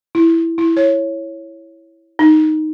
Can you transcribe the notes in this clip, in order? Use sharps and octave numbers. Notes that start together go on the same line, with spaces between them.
E4
E4
C#5
D#4